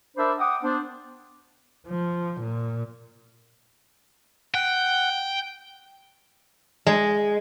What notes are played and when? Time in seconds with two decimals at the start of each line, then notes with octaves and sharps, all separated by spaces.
0.17 D4 A#4 C5 D5 E5 B5
0.39 F#5 G5 D6 D#6
0.63 B3 D4 C5
1.87 F3
2.40 A#2
4.55 F#5 G5
6.87 G#3